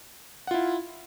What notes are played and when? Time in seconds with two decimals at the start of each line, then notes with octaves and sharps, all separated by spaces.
0.47 F#5
0.51 F4
0.54 E4